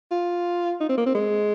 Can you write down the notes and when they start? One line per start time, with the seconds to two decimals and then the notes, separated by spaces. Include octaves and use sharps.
0.11 F4
0.80 D#4
0.89 C4
0.97 A#3
1.06 C4
1.15 G#3